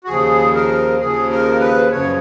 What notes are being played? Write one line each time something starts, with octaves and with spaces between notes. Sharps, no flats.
F#4
D#2 C#3 F3 G#4
A#4
D#2 C#3 F3 G#4
A#4
B4
F#2 C#3 F3 C#5